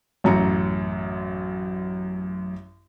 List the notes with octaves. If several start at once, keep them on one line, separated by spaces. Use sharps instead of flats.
A1 F#2 A#5 C#7